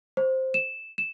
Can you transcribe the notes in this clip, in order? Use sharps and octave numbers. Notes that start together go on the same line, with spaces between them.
C5
E7
E7